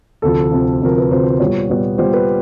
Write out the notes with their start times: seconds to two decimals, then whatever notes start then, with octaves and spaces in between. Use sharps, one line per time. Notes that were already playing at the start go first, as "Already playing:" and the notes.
0.22 D2 C3 F3 A4
0.51 D2 C3 F3
0.81 D2 C3 F3 A#4
0.98 B4
1.11 D2 C3 F3 C5
1.40 A#2 G3 B3 C#5
1.69 A#2 G3 B3
1.98 A#2 G3 B3 C5
2.13 B4